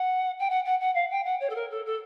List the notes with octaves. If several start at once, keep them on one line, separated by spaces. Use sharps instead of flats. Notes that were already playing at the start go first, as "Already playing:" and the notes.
Already playing: F#5
G5
F#5
F#5
F#5
F5
G5
F#5
C#5
A4
A#4
A4
A4